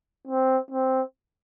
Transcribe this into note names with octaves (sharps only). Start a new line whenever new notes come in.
C4
C4